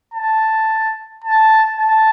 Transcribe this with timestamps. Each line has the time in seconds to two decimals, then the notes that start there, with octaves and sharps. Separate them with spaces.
0.14 A5
1.24 A5
1.79 A5